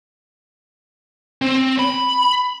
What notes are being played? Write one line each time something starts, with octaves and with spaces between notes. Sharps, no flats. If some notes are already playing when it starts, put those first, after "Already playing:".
C4
B5